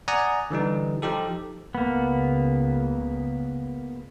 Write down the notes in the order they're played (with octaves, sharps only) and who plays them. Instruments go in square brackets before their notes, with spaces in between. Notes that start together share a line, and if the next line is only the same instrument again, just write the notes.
[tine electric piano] D5 F#5 G#5 A#5 D#6
D3 E3 G3 D#4
F3 D#4 G4 A4
[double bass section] C#2 C#3 [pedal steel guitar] A#3 B3